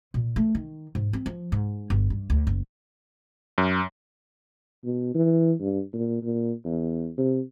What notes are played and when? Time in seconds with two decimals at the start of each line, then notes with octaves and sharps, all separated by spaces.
0.14 A#2
0.36 A3
0.55 D#3
0.95 G#2
1.13 C4
1.26 F3
1.52 G#2
1.90 G1
2.10 G2
2.30 D2
2.47 F#1
3.58 F#2
4.85 B2
5.15 E3
5.61 G2
5.93 A#2
6.23 A#2
6.65 E2
7.18 C3